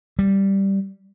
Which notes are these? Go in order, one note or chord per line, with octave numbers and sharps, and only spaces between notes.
G3